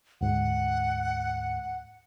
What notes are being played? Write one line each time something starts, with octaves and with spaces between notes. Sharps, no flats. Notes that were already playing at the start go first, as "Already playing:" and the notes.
D2 G#2 F#5